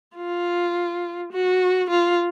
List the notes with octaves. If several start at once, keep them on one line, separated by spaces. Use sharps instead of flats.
F4
F#4
F4